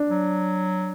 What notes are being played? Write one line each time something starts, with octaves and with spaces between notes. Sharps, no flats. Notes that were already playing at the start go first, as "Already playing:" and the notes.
Already playing: D4
F#3